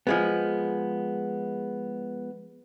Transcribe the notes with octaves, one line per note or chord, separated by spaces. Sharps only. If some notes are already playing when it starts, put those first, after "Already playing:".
F3 G#3 B3